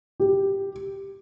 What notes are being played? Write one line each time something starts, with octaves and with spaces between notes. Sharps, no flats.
G4